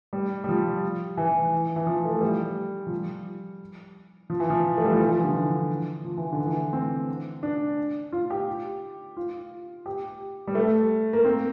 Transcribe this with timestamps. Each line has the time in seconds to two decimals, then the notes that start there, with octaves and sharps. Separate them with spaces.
0.13 G3
0.44 G3
0.49 F3
1.17 E3
1.76 E3
1.86 F3
2.05 A3
2.16 A3
2.21 G3
2.87 F3
2.91 G3
4.30 F3
4.40 E3
4.50 F3
4.78 A3
4.84 G3
4.92 F3
5.00 E3
5.07 F3
5.12 E3
5.23 D3
5.34 D3
6.04 F3
6.17 E3
6.33 D3
6.46 E3
6.73 C4
7.43 D4
8.12 F4
8.30 G4
9.17 F4
9.86 G4
10.47 G3
10.55 A3
11.13 A#3
11.25 C4